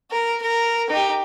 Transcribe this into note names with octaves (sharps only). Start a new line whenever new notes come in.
A#4
A#4
D#4 G4